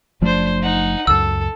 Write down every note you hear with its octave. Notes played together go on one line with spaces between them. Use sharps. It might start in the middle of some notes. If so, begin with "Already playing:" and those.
F#1 F3 A3 D4 C5
D#4 F#5
C#2 F#2 A4 E6